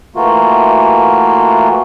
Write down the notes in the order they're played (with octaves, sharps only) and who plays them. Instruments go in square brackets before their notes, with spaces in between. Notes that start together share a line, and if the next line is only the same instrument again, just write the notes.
[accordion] E3 A3 A#3 F4 F#4